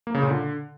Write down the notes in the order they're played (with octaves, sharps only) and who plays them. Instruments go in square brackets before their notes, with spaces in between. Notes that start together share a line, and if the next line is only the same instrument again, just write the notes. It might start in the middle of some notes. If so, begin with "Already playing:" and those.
[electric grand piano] A#3
C#3
A#2
D3